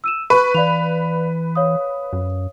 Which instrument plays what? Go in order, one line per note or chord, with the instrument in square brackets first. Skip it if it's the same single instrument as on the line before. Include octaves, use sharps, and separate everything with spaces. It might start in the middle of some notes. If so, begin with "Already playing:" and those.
[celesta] E6 D#7 E7
[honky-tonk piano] B4 [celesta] C#6
[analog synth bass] E3 [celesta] D5 F5 F7
[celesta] C#5 F5 D#6
[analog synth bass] F#2